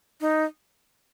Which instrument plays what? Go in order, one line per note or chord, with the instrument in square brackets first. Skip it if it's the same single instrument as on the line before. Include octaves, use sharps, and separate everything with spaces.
[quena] D#4